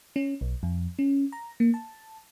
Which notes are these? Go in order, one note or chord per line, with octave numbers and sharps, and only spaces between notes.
C#4
B1
F2
C#4
A#5
A#3
A5